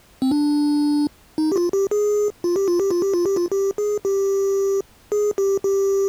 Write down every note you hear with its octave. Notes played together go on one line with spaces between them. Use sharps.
C4
D4
D#4
G4
F4
G4
G#4
F4
G4
F4
G4
F4
G4
F4
G4
F4
G4
G#4
G4
G#4
G4
G4